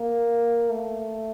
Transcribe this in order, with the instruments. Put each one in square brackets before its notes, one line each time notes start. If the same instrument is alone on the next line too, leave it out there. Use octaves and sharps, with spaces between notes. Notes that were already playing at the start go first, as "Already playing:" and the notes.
Already playing: [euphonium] A#3
A3